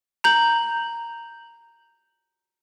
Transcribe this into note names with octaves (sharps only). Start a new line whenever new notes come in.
A#5 G6 F#7